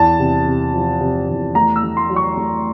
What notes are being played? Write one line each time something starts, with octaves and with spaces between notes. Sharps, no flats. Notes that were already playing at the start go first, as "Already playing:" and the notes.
Already playing: E2 A5
C3
C3
F3
C3
E2
A3 A#5
E6
A3
C6
F#3
C#6
A3